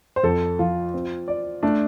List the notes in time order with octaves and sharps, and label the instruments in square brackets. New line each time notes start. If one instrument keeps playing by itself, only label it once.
[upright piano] C5
[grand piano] F2 [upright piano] A4
[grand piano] F3 [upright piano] F4
[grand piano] C4
D5
[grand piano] A3 [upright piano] D4